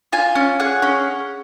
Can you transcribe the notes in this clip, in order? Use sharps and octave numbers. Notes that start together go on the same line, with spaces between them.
F4 G#5
C#4
G#4 F#5
C#4